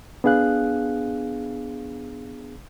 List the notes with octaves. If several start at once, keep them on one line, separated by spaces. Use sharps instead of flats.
B3 D4 G#4 F5 F#6